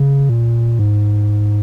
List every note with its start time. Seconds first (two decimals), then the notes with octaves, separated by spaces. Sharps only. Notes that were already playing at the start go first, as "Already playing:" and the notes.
Already playing: C#3
0.29 A#2
0.79 G#2